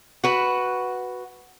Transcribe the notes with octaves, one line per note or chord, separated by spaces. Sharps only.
F#4 B4